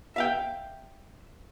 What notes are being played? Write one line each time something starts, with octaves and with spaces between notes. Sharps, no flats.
E5 F5 G5